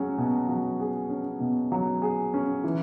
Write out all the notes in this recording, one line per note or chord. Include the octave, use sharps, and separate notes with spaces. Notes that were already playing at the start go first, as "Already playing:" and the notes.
Already playing: F#3 C#4 G#4
B2
F#3
G#4
C#4
B2
F#3
G#4
C#4
E3